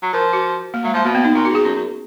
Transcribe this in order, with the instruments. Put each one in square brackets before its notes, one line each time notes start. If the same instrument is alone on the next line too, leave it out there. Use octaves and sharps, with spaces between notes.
[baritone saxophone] F#3
[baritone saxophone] F3 [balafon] A#4
[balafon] F#4
A#3
[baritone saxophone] F#3 [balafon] G#3
[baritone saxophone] F3 [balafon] G#3
[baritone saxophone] B2 [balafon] A#3
[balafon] B3
D#4
[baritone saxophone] A#2 [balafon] F4
[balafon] F#4
[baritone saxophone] G#2 [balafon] G#4
[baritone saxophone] F#2 [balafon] C#4
[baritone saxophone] F#2